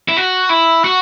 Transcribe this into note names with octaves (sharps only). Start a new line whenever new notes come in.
E4
F#4
E4
F#4